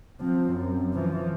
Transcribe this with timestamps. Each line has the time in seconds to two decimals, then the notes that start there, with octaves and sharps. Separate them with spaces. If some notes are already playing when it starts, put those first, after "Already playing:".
0.20 F3 C4
0.51 F#2
0.93 E3 F3